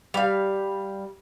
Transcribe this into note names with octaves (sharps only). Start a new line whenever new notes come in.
G3 F5